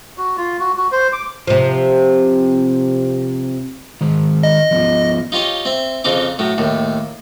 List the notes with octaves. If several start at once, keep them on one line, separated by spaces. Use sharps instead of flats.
F#4
F4
F#4
F#4
C5
D6
C3 F3
D#3 G#3 A#5
D#5
F3 B3 F4
D#4 F4 G4 C#5 D#5
C4 E5
F2 C#3 C4 D#4 D6
A2 F#3
D#2 A2